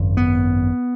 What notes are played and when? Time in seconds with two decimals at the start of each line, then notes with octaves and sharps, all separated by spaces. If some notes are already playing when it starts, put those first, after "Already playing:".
Already playing: G#1 F#2 C#3
0.17 B3